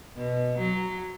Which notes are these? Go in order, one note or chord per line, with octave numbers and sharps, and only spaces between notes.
B2
F#3